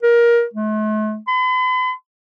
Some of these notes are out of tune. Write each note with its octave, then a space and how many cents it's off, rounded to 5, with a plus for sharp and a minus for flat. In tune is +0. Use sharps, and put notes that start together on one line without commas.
A#4 +20
A3 -45
B5 +45